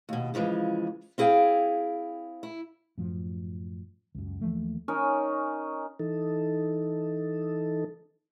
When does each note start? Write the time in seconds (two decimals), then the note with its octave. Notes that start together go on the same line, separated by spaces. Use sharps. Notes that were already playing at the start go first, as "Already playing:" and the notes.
0.09 D#2 B2
0.34 C#3 E3 F3 G#3
1.18 C4 E4 G#4 F5 G5
2.43 E4
2.98 F#2 A2 F3
4.15 C#2 F#2
4.41 D#2 E3 F3 A3
4.88 C#4 D#4 A#4 D#5
5.99 E3 D#4 A4